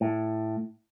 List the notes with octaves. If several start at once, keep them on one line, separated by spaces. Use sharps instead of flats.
A2